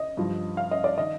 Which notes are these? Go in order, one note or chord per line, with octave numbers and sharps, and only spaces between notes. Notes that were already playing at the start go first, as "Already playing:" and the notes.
Already playing: D#5
G2 F3
F5
D#5
D5
D#3 D#5